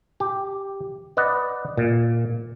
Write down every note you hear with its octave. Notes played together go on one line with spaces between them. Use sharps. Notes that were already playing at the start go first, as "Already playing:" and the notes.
G4
B4 D5 D#5 F#5
A#2